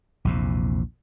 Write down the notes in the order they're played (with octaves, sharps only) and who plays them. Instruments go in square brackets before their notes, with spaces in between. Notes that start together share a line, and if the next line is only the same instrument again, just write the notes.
[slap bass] A#1 E2 C3